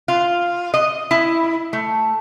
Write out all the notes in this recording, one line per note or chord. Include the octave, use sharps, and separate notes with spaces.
F4
D#5
E4
A3